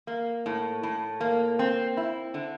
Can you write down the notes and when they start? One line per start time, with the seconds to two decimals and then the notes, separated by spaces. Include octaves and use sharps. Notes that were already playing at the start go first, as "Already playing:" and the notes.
0.07 A#3
0.46 A2
0.83 A2
1.20 A#3
1.59 C4
1.97 E4
2.34 D3